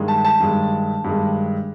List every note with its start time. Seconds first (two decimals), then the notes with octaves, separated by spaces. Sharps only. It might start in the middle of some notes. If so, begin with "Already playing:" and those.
Already playing: G2 D#3 G#3
0.08 A5
0.25 A5
0.40 G2 D#3 G#3
1.04 G2 D#3 G#3